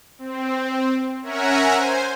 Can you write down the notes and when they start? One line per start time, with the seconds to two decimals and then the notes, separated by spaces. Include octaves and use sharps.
0.19 C4
1.22 C#4 A#4 E5 F#5 G#5 A#5
1.74 C5 G#5